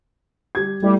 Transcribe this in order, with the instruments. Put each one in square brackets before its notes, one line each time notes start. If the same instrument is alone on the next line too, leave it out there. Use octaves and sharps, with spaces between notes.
[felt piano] G3 G4 G#6
[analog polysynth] G3 [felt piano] A3 E4 D5